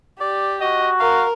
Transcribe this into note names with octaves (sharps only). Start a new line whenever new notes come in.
G4 D5
F#4 D#5
A#4 F5